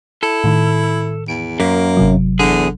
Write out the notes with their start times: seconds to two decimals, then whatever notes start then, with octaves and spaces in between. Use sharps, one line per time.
0.23 E4 A4
0.44 A2 D#3
1.28 E2 D7
1.60 F#2 A#3
1.97 G1 C3 F#3
2.39 E2 D3 G#4